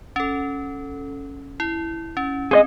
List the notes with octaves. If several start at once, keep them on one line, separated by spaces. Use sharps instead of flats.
C#4 A4
E4
C#4
C4 G#4 C5 D#5